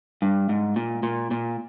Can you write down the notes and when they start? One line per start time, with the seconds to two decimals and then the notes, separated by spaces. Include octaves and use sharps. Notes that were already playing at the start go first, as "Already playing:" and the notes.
0.22 G2
0.49 G#2
0.76 A#2
1.03 A#2
1.31 A#2